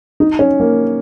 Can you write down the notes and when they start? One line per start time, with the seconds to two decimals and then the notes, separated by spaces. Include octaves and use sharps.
0.20 D#4
0.39 C#4
0.60 A#3